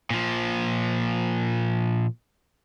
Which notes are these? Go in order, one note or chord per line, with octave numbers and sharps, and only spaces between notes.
A#2 F3